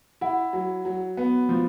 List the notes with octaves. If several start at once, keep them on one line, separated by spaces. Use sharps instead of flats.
E4 F#5
F#3
F#3
B3
F3